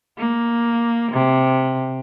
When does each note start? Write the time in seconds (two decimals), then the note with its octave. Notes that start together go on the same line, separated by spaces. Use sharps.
0.18 A#3
1.12 C3